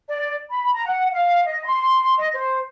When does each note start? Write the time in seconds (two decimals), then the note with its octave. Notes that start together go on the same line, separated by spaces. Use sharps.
0.09 D5
0.49 B5
0.73 A#5
0.85 F#5
1.12 F5
1.45 D#5
1.65 C6
2.18 D#5
2.33 C5